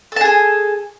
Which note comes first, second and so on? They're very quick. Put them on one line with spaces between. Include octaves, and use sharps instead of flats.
A4 A5 G#4 G#5